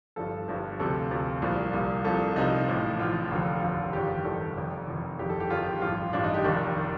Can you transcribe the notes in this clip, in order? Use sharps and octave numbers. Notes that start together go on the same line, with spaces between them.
G1 G2 F3 A4
G1 G2 F3
D2 C3 F3 A4
D2 C3 F3
C2 A#2 F3
C2 A#2 F3
C2 C3 F3 A4
C2 C3 F3 D#4
A1 A2 F3
A1 A2 F3 F4
F1 D#2 D3 F3
F1 D#2 D3 F3
G1 F2 D#3 G4
G1 F2 D#3 A4
F1 F2 D#3
F1 F2 D#3
G1 F2 D#3 G4
A4
G4
G1 F2 D#3 F4
G4
A1 G2 F3 F4
A1 G2 F3 D4
D#4
G4
F1 D#2 D#3 D4
D#3